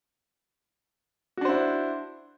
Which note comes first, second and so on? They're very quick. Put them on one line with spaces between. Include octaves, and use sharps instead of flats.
F#4 D4 C5 E4